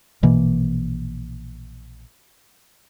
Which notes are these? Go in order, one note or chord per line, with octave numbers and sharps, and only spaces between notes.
A#1 B2 E3 A#3